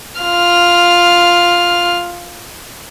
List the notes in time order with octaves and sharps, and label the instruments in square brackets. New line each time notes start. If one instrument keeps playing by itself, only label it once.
[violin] F4 F6